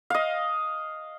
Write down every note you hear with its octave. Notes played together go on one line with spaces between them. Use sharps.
D#5 F5